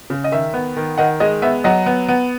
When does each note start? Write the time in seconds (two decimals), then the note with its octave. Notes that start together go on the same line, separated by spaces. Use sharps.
0.10 C#3
0.24 D#5
0.32 D#3 E5
0.54 B3
0.77 D#3
0.98 D#3 D#5 F#5
1.20 G#3 D#5
1.42 B3 E5
1.64 F#3 D#5 F#5
1.86 B3
2.09 B3